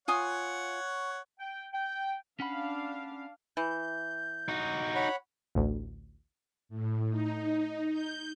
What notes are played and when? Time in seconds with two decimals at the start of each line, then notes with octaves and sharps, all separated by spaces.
0.08 F4 C#5 F#5 G#5 D#6
1.40 G5
1.73 G5
2.40 C#4 D4 F5 F#5 B5
3.57 E3 G6
4.48 D#4 F#4
4.95 C#5 F#5 B5
5.55 A1 D2
6.69 A2
7.09 D#4
7.92 G6